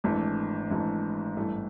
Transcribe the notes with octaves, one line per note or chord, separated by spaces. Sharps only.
G#1 G#2 E3 A3 D4
G#1 G#2 E3 A3 D4
A1 G2 E3 A3